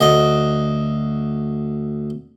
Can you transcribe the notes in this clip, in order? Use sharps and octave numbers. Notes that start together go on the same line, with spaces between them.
D2 D#5